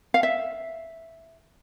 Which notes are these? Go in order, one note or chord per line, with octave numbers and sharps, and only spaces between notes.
F5
E5